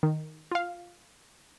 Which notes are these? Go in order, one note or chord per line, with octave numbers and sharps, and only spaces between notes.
D#3
F4 F5